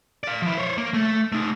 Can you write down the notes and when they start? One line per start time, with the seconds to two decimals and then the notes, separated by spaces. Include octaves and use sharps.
0.24 D5 F5
0.42 F3 E4
0.58 C5 C#5
0.78 A#3
0.94 A3
1.32 A3 D#4